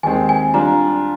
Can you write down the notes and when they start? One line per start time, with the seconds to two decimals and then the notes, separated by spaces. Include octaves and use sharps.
0.03 D#2 D#3 G#3 C4 G#5
0.29 G#5
0.54 G3 D4 F4 A#5